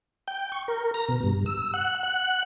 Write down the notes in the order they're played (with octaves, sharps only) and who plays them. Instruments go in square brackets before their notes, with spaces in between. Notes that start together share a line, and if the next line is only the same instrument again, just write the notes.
[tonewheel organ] G5
C#6
A#4
A#5
B2
G2
E6
F#5
F#5